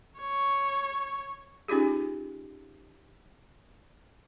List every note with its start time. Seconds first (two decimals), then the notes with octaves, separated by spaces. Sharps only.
0.18 C#5
1.68 C#4 D#4 F4 G4 G#4